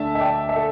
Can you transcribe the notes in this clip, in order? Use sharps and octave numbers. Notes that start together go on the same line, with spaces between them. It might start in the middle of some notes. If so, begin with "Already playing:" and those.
Already playing: D2 D3 A3 E5 A5
E5
D5 G5
E5
A4